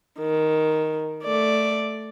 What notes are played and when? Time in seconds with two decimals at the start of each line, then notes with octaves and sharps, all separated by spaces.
0.19 D#3
1.23 A3 D5